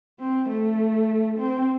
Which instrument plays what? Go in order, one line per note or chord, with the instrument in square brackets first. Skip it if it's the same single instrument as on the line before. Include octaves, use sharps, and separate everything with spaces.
[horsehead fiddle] C4
A3
C4